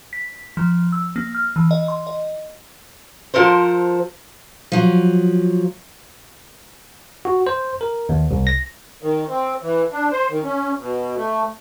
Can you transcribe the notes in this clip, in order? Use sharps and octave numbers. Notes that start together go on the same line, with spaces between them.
B6
F3
E6
A#3
F6
E3
D#5
C6
D#5
F3 A4 A#4 C5
F3 F#3
F#4
C5
A#4
D#2
C2
A#6
D#3
C4
E3
D4
C5
D#3
C#4
B2
A3